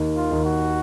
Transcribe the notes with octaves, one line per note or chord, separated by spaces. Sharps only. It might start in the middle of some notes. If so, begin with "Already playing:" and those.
Already playing: D#2 D#3
F4
D#2 D#3
F#4